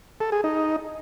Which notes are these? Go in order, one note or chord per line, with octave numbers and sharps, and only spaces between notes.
A4
G#4
D#4